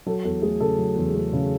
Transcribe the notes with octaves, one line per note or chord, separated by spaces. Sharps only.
F#3 A4
E2 A4
A3 G#4
C#3 A4
F#3
E2
A3
C#3